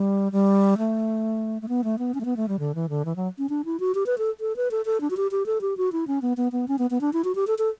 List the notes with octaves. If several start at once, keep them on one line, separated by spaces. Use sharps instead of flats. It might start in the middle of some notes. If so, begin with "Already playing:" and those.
Already playing: G3
G3
A3
A3
B3
A3
B3
C#4
A3
B3
A3
G3
D3
E3
D3
E3
F#3
C#4
D4
E4
F#4
G4
B4
A4
A4
B4
A4
A4
D4
F#4
G4
G4
A4
G4
F#4
E4
C#4
B3
B3
B3
C#4
B3
B3
D4
E4
F#4
G4
A4
A4